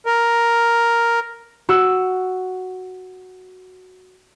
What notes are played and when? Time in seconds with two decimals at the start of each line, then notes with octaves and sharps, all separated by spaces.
0.06 A#4
1.69 F#4 E6